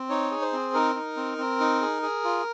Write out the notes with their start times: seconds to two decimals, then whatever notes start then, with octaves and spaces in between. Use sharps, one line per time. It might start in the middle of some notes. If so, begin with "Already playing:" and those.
Already playing: C4
0.10 D#4 C#5
0.31 G#4
0.41 C5
0.53 C4
0.74 D#4 A#4
0.95 D#4
1.17 C4
1.38 C4
1.60 D#4
1.81 G#4
2.03 G#4
2.24 F4